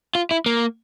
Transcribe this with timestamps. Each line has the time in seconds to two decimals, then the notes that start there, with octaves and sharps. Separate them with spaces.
0.15 F4
0.31 E4
0.46 A#3